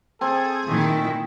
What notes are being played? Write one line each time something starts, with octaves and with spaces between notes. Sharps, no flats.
C4 G#4 A4
A#2 D#3 A3 E4